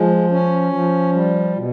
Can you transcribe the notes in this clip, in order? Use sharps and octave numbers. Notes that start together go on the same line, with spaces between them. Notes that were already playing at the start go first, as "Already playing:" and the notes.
Already playing: F3 G#3
C#4
F3
G3
B2